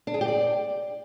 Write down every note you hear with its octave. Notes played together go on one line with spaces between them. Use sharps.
D4
G#4
G4
D5